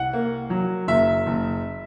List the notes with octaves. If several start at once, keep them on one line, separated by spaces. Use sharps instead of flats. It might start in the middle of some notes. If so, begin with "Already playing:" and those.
Already playing: C2 F#5
A#3
F#3
F#1 E5
F#1